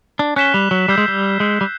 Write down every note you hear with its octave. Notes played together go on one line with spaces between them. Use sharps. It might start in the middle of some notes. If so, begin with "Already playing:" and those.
D4
C#4 F#6 B6 E7 G7
G3
F#3
G3 E6 G6 C7
G#3
G3
G#3 E6 G6 C7
G3